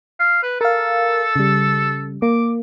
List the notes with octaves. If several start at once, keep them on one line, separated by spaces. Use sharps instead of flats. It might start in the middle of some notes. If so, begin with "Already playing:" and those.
F5
B4
A4 A#4 F5
C#3 G3
A#3 D6